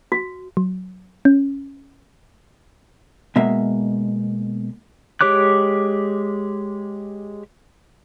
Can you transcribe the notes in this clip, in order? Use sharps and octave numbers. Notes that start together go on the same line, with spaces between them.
F#4
F#3
C#4
B2 G#3 A#3 E5
G#3 G4 C#5 D6 F#6